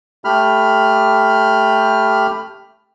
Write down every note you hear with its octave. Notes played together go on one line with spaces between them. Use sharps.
A3 G4 B5 F6